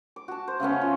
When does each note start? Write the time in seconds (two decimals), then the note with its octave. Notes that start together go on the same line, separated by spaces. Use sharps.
0.16 D6
0.28 F#4 A5
0.48 C5
0.60 C#3 A3 B3 C#4
0.81 F4